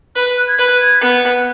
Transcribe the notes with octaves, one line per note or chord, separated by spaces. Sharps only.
B4 F#6
F#6
G#6
B4 F#6
G#6
B3 F#6
F#6